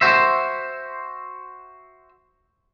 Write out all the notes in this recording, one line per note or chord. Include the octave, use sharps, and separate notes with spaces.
F#4 C5 E5